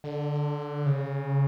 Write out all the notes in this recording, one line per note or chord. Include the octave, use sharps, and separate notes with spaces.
D3
C#3